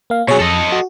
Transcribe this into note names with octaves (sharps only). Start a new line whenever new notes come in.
A#3 F5
B2 F#3 G#4 C#5
F2 A4 D#5
F#4